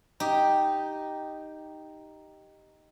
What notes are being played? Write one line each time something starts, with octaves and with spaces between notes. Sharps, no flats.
D#4 G4